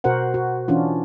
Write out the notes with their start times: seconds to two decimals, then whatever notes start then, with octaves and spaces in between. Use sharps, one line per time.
0.04 B2 F#4 A#4 C5 F#5
0.34 F#4
0.68 E3 C#4 D4 F4